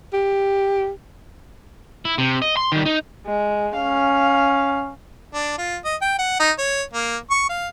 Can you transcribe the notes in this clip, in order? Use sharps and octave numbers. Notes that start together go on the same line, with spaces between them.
G4
E4
C3
D#5
C6
D#3 G3
D#4
G#3
C#4 F5
D4
F4
D#5
G5
F#5
D#4
C#5
A#3
C#6
F5